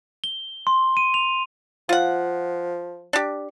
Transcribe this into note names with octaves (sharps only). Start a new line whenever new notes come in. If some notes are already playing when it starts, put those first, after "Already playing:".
G7
C6
D#7
F7
F3 F4 F#5
D4 G4